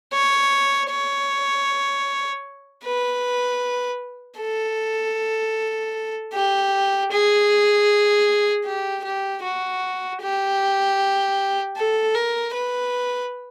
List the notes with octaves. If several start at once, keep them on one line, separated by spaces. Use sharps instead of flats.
C#5
C#5
B4
A4
G4
G#4
G4
G4
F#4
G4
A4
A#4
B4